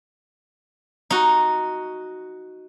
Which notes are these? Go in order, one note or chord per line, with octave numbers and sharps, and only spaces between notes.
D#4 F#4